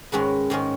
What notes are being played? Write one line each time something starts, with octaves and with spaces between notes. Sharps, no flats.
G#2 D#3 G#3 C#4 B4
G#2 D#3 G#3 C#4